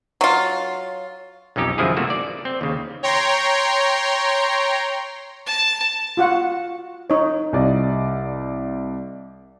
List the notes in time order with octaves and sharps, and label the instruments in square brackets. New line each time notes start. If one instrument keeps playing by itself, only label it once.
[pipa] F#3 F4
[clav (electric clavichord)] B1 F2 C#4 D#4 G4
C#2 F#2 D#3 F3 E4 G#4
C3 A3 A#3 F#4
D5
C4
D#2 C#3
[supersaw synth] C#5 G5 A#5 C6
[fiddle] A5
[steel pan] F4 F#4 F#5
D#4 C#5
[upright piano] C2 D5 D#5